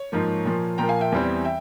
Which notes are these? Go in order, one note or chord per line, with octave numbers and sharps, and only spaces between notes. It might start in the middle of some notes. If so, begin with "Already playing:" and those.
Already playing: C#5
G#2 F3 A#3
A#2 F3 A#3
A#2 F3 A#3 G5 A#5
F5 G#5
E5 G5
E2 E3 G3 C4
E5 G5